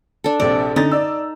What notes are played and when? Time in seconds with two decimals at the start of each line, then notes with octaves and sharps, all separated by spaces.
0.24 D4 A4
0.40 A#1 C3 A4 D5
0.76 D3 C#4 D#4 A6
0.92 D5 E6